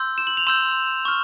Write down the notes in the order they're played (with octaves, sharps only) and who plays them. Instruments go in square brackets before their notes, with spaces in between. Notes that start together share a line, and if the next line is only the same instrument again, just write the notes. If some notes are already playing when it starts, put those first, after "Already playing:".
Already playing: [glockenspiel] C6 E6 G6
E7
F#7
F7
C6 E6 G6 E7
C#6 F6